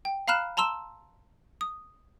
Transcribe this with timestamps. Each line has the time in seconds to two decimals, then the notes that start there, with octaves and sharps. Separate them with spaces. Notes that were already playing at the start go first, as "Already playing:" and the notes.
0.05 G5
0.28 F5 A#5 B5 F6 F#6 E7
0.57 A5 A#5 C6 E6 E7
1.61 D#6